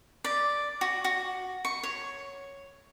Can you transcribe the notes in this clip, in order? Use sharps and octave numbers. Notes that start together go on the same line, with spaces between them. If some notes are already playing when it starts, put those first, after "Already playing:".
D5
F#4
F#4
C#6
C#5